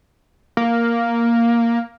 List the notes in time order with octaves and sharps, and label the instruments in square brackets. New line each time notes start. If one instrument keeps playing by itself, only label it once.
[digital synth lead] A#3